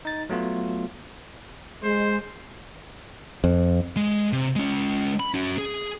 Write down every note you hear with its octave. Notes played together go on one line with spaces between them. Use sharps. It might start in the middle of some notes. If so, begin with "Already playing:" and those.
D#4 A6
F#3 A3 B3 F4
G#3 C5
F2
G#3
C3
G#3 C#4
B5
C#4 F#4
G#4